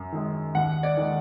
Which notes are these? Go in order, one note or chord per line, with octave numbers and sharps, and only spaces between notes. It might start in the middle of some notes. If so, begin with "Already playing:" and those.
Already playing: F#2
D#3 G#3
D#2 F#5
D5
D#3 G#3